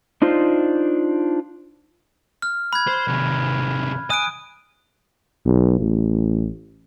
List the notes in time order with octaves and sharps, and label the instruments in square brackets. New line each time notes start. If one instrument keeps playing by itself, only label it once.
[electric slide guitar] D4 D#4 F4 C5
[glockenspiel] F6
B5 F#6 G#6
[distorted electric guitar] C5
C3 D#3
[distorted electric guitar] G#5 [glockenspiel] D#6 F#6 D7
[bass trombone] B1
A1